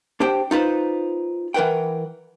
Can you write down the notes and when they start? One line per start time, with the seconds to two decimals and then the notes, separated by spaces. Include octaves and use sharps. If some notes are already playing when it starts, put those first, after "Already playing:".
0.20 D4 G4 C5 G5
0.51 D#4 F4 B4 C5
1.54 E3 A#4 B4 F#5 G5